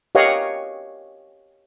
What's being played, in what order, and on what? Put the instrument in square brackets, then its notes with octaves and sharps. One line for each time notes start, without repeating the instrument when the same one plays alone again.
[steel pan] G4 A#4 C#5 D#5 F5 F#5